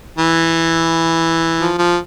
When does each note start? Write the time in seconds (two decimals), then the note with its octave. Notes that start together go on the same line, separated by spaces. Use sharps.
0.18 E3
1.61 F3
1.78 F3